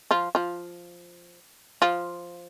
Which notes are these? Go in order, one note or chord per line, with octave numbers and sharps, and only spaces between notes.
F3 F4
F3 F4
F3 F4